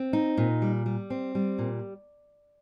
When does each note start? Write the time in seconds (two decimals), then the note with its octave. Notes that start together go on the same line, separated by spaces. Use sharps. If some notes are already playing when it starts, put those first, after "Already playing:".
Already playing: C4
0.13 D#4
0.37 A#2
0.62 G3
0.86 G3
1.10 C4
1.35 G3
1.58 A#2